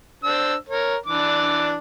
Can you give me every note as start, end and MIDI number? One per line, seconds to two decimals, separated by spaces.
0.24 0.54 62
0.24 0.54 72
0.24 0.54 88
0.69 0.96 70
0.69 0.96 73
1.06 1.78 52
1.06 1.78 62
1.06 1.78 86